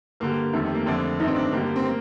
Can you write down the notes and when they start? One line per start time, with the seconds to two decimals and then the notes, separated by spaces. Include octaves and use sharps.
0.20 G2 D3 G3 A#3
0.53 F2 D#3 G3 A3
0.65 A3
0.75 A#3
0.86 F2 D3 F3 A3 D4
1.20 G2 D#3 A3 D#4
1.27 C4
1.36 D4
1.52 G2 D3 G3 A#3
1.76 C4
1.86 A#3